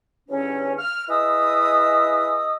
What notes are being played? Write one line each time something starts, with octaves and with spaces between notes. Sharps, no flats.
E2 G2 D3 C#4
F6
E4 G#4 B4 D#5 D#6 E6